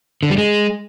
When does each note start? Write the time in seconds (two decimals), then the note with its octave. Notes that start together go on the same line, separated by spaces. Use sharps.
0.23 D3
0.30 G3
0.38 G#3